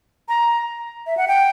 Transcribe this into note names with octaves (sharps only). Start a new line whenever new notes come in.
A#5
E5
F#5
G5